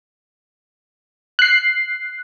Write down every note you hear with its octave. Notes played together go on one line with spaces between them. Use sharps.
F#6 C7